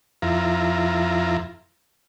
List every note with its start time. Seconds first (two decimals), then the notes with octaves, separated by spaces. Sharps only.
0.22 F2 E4 F4 A#5